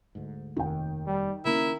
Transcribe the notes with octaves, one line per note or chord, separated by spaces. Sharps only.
D2 G#2
F1 D#2 D#3 G5
G3
C#3 A#3 C#4 E4 A#4